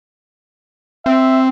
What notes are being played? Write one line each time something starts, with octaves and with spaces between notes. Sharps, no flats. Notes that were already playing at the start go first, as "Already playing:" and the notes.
C4 E5